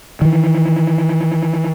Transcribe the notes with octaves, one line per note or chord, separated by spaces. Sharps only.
D#3 E3